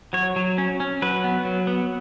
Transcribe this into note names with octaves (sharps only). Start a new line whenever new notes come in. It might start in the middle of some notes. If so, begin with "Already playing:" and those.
F#3 C#5
F#3
C#4
C#4
F#3 B4
B3
F#3
B3